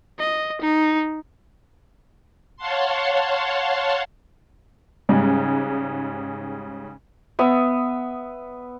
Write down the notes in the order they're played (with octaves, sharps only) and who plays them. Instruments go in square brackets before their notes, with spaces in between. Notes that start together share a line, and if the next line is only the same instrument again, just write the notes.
[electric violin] D#5
D#4
[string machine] C#5 F5 F#5 A5 C6
[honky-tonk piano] G#2 C#3 G3 G#3
[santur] B3 E5